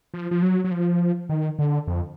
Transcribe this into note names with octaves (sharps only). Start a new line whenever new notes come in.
F3
F3
F#3
F#3
F3
D#3
D3
F2